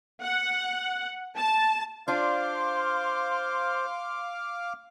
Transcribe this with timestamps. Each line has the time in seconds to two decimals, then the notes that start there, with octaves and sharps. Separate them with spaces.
0.22 F#5
1.36 A5
2.08 D4 F4 C5 F5 C6 D6 F6